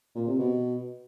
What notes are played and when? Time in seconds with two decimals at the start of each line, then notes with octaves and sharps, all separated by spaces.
0.15 A#2
0.27 C3
0.39 B2